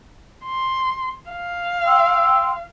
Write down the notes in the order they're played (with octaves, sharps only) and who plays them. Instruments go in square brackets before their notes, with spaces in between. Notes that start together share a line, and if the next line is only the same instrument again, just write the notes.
[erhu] C6
F5
[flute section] G5 C6 E6